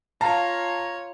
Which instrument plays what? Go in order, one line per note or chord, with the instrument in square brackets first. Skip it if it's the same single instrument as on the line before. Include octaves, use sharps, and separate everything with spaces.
[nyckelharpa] F4 C#5 [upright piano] F5 A5 [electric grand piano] A#5